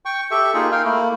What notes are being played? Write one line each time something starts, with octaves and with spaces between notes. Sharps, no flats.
G5 C#6
G4 A4 E5 C#6
A#3 D#4 F4 G#4
A#4 F5 G5
A3 A#3 E4